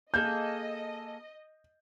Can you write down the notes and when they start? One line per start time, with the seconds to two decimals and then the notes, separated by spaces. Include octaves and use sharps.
0.14 A#3 G#4 A4 D#5 G6